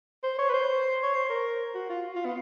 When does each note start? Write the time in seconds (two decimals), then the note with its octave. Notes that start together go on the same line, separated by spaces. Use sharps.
0.23 C5
0.38 C#5
0.49 B4
0.54 C5
1.03 C#5
1.14 C5
1.29 A#4
1.75 F#4
1.89 F4
2.16 F4
2.25 B3